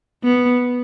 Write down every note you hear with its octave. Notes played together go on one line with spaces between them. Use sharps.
B3